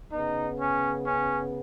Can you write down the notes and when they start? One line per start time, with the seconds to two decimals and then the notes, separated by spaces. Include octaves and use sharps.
0.12 C#3 B3 D#4
0.59 C#4
1.06 C#4